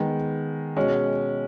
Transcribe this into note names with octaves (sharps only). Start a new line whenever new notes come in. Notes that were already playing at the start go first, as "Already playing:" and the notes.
Already playing: D#3 G#3 B3
B2 G#3 C#4